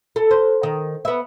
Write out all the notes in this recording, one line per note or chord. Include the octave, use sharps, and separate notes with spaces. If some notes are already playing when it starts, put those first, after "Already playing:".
A4
C5
D#3
B3 E5